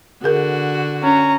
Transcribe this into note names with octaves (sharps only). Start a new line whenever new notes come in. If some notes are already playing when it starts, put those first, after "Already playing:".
D3 F#4 G#4 A#4
C#4 A#5